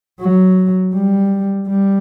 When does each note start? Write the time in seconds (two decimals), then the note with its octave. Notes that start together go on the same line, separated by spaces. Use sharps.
0.21 F#3
0.94 G3
1.68 G3